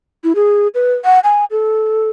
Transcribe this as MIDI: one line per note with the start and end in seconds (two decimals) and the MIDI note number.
0.24 0.33 64
0.35 0.68 68
0.75 0.93 71
1.05 1.20 78
1.24 1.45 80
1.51 2.10 69